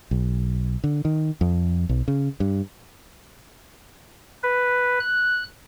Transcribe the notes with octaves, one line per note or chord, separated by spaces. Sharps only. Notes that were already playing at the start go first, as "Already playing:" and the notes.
B1
D3
D#3
F2
B1
C#3
G2
B4
F#6